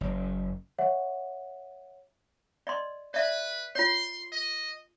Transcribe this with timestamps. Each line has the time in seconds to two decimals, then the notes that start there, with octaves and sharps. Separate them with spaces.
0.01 F#1
0.79 C#5 E5 F#5
2.67 D5 D#5 C6
3.14 B4 D5 E5
3.75 F4 C#5 C6
4.32 D#5